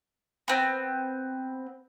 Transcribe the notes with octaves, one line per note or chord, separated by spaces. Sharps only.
B3 C4